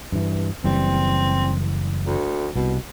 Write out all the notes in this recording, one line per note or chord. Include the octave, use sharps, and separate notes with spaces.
G2 E3
F#1 E3 G3 C4
D2
C2 B2